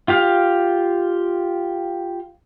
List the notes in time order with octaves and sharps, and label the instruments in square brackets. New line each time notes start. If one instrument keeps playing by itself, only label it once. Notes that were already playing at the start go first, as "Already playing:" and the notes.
[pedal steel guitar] F4 G4 F5